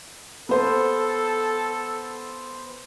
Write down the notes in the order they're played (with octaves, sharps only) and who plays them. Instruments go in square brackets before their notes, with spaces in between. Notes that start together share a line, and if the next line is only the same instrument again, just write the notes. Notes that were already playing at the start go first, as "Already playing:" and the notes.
[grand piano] B3 C5 [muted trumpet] A4